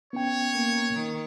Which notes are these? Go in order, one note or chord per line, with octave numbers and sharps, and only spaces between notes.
B3 C#4 C#5 G5
A#3
D#3